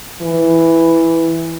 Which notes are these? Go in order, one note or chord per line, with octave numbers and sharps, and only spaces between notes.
E3